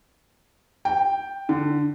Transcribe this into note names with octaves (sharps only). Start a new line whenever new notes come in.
G5
D3